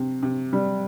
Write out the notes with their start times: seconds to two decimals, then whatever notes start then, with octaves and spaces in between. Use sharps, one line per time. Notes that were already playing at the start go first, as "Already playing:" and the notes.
Already playing: C3
0.23 C3
0.53 G3